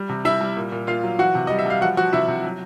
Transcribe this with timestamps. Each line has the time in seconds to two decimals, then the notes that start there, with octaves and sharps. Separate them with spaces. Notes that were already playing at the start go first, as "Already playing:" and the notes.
Already playing: G3
0.09 C3
0.25 G3 E4 E5
0.41 G3
0.56 A#2
0.72 A#2
0.87 A#2 F4 F5
1.03 F#3
1.19 E3 F#4 F#5
1.35 C3
1.47 G3 D#5
1.59 E5
1.66 G3 F5
1.81 F3 F#4 F#5
1.97 F3 F#4 F#5
2.13 C3 E4 E5
2.28 C3
2.44 F#3